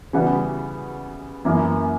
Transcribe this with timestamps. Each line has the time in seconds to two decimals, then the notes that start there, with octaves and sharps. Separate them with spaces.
0.13 C#3 E3 G3 B3 F#4
1.45 F#2 E3 A#3